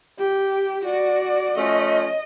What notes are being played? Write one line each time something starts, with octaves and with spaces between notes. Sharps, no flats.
G4
F#4 D5
F3 A3 C#4 D#5